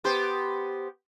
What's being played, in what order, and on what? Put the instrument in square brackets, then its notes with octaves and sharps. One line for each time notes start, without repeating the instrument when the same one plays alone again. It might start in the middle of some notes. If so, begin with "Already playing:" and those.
[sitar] B3 G4 C5